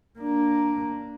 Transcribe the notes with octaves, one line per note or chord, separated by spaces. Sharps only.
A#3 D4